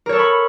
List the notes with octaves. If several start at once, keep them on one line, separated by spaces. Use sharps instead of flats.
A4 A#4 C#5 B5 C#6